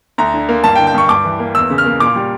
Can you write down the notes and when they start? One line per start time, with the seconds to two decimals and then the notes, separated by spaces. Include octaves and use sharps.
0.18 D2 A#5
0.34 D3
0.49 A#3
0.64 G2 A5
0.75 G5
0.79 D3
0.87 G5
0.94 G2 C#6
1.09 G2 D6
1.25 E3
1.39 A#3
1.55 E2 E6
1.70 C#3
1.78 F6
1.86 A#3
2.00 A#2 D6
2.16 G3